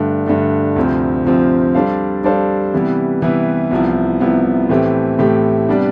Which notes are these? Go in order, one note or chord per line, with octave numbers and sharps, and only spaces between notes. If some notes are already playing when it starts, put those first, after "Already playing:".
Already playing: G2 D3 A3
G2 D3 A3
D2 C3 F3 C4
D2 C3 F3 C4
G3 D4 A4 C5 F5
G3 D4 A4 C5 F5
C3 E3 G3 B3 E4
C3 E3 G3 B3 E4
C2 C3 F3 B3 E4
C2 C3 F3 B3 E4
A2 E3 A3 C4 G4
A2 E3 A3 C4 G4
C3 G3 B3 D4